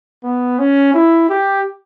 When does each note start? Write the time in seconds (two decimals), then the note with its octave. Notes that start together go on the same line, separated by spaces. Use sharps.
0.24 B3
0.59 C#4
0.94 E4
1.29 G4